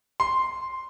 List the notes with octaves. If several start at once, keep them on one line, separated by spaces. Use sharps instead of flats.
C6